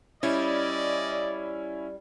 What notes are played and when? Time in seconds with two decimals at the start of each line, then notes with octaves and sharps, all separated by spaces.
0.23 G3 C#4 E4 D5 D#5